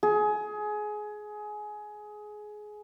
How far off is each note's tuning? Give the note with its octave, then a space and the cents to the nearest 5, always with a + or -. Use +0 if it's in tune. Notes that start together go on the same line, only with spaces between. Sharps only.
G#4 +20